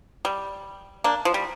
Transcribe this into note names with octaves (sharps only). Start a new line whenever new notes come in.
G3
A#3 D4
F3
G3